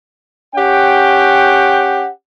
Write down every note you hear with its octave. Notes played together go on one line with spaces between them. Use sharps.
C#4 G4 F#5 G5